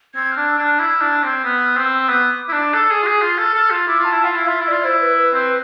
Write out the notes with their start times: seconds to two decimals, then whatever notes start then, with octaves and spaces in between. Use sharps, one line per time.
0.15 C4 G#6
0.32 D4 F6
0.47 E6
0.58 D4 G#6
0.64 F6
0.80 E4 G#6
0.96 F6
1.01 D4
1.13 E6
1.24 C4 G#6
1.44 B3 F6
1.66 E6
1.77 C4
1.88 E6
2.09 B3 D6
2.49 E4
2.53 D4
2.74 A4
2.91 G#4
3.03 F4
3.07 G#4
3.22 F4
3.39 A4 F6
3.55 A4 F6
3.71 F4
3.87 E4 D6
4.00 F4 A5
4.12 E4
4.24 F4 F5
4.36 E4
4.47 F4 E5
4.60 E4
4.68 F4 D5
4.84 E4 C5
5.01 B4
5.17 B4
5.34 C4